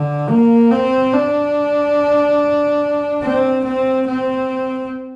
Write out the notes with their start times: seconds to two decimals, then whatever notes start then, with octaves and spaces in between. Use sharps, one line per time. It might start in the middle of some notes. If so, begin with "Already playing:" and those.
Already playing: D3
0.29 A#3
0.71 C4
1.13 D4
3.23 C4
3.65 C4
4.07 C4